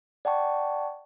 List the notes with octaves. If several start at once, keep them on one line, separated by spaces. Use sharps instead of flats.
D5 F#5 G5 A5 C#6